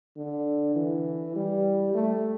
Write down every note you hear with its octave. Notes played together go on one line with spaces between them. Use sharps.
D3
E3
G3
A3